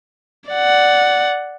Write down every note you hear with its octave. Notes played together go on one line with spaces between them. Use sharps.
D5 F#5